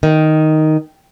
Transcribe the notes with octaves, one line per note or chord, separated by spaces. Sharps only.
D#3